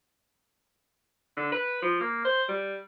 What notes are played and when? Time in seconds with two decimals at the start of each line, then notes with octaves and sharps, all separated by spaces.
1.37 D3
1.52 B4
1.82 F3
2.01 A#3
2.25 C5
2.49 G3